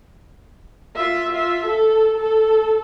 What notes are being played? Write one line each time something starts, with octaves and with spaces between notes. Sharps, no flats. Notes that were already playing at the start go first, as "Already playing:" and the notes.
F4 E5
F4 E5
A4
A4